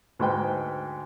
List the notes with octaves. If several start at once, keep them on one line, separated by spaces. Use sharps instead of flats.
D2 G#2 B4 G5